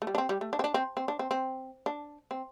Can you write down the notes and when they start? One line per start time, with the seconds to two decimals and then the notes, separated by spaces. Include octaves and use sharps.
0.02 A3
0.07 G3
0.15 D4
0.18 C4
0.29 G3
0.41 A3
0.53 D4
0.59 C4
0.64 D4
0.74 C4
0.97 C4
1.08 D4
1.19 C4
1.31 C4
1.86 D4
2.31 C4